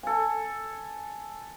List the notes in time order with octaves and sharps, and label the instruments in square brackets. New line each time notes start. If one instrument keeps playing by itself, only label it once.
[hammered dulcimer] A4 G#5